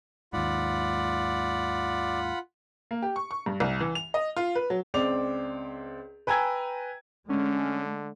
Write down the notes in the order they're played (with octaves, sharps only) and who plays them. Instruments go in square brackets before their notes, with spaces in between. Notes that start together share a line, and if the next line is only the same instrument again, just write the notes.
[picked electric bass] D#2 G#2 [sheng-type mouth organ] F4 F#5 B5 [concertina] D5
[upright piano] A#3
G4
C#6
C#6
G2
C2
E3
F7
D#5
F4
B4
F#3
[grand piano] C#2 C4 D5 F7
B4 G5 G#5 A#5 E6 G#6
[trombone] D3 [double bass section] G#3 A3 [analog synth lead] C#4